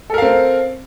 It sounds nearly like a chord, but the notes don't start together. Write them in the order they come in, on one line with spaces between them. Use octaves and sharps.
A4 A#4 F5 C4